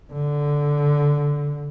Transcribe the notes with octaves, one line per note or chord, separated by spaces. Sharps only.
D3